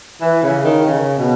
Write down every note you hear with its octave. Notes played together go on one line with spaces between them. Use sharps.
E3
C#3
D#3
C#3
B2